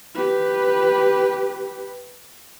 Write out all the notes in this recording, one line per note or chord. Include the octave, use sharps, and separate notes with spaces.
G4 B4